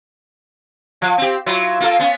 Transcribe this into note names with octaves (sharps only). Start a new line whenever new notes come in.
F3
C4 G4
F#3 E4 F4
A#3 F4 A4
B3 C#4